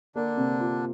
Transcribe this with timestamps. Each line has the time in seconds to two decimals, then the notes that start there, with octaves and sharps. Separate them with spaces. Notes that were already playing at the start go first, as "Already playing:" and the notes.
0.15 D3 A#3 D4
0.37 C3
0.60 F4